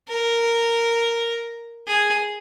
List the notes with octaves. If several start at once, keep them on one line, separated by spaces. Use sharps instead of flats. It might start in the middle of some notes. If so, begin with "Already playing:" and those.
A#4
G#4